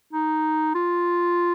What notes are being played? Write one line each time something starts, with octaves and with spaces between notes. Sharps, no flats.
D#4
F4